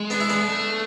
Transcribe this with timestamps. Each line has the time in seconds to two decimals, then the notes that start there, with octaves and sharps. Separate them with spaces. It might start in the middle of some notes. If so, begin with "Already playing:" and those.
Already playing: G#3
0.10 B3 D4
0.21 E4
0.30 B3 D4
0.49 A3